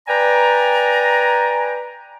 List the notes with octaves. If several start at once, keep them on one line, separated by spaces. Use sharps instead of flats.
B4 D5 G5 G#5 A#5